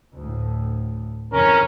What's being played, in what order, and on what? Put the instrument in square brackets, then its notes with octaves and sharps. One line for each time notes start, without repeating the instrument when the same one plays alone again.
[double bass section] D2 A2
[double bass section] F2 C#3 E3 [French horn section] C#4 [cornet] A#4